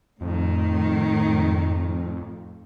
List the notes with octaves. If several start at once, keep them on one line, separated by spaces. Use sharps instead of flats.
F2 A2 D#3